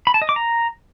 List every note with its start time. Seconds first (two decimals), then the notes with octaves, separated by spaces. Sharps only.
0.07 B5
0.14 A5
0.22 D#5
0.29 D6
0.36 A#5